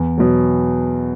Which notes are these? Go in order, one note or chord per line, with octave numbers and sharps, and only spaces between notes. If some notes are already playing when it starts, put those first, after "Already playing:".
Already playing: E2
B2 F#3